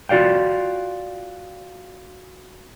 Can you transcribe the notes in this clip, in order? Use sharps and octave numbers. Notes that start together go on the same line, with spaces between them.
F4 F#4 D5 F5 G5